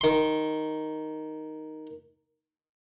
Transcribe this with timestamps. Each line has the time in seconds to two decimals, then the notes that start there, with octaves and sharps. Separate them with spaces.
0.01 D#3 C6